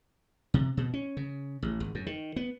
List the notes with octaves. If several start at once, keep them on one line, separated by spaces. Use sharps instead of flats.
C3
B2
C#4
C#3
A1
G#1
F#2
D#3
B3